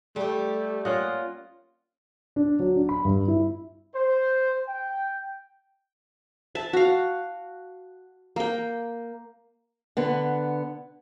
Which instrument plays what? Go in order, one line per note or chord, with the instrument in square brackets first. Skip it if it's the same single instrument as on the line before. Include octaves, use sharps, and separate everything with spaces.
[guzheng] G3 G4 [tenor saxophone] A3
[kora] A#3 C#4 D#5 [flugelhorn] F4 [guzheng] F#5
[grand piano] D4
F#3
D4
B5
G2
E4
[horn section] C5
G5
[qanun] E5 A5
F#4 F5
A#3 G5
[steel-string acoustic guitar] D3 B3